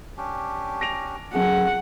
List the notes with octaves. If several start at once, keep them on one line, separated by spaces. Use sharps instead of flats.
C#4 D4 G4
A#6 D7 F7
F#2 A3 G#4 F#5